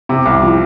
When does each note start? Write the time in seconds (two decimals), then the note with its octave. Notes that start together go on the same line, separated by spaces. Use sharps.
0.09 C3
0.25 C2
0.43 F3